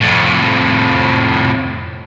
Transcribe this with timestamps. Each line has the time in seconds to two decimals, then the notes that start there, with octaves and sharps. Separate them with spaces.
0.01 F2 A2